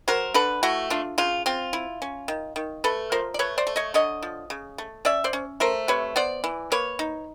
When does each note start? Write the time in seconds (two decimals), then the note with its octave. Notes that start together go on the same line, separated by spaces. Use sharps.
0.08 F#3 A#4 C5
0.34 D3 A4 B4
0.63 A3 E4 F#4
0.90 D4 F4
1.18 C#3 F4
1.46 C4 F4
1.73 E4
2.02 C#4
2.28 D#3
2.56 D#3
2.84 A3 A4 B4
3.12 F3 A#4 C5
3.34 D5
3.39 A3 B4 C#5
3.58 C5 D5
3.67 A3
3.76 C#5 D#5
3.94 D3 C#5 D#5
4.23 F3
4.50 C#3
4.78 A3
5.05 C#4 D5 E5
5.24 C5 D5
5.33 C#4
5.60 A3 A#4 C5
5.88 C3 B4 C#5
6.16 B3 C5 D5
6.44 E3
6.72 A#3 B4 C#5
6.99 D#4